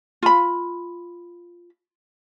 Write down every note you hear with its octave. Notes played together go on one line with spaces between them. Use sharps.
F4 B5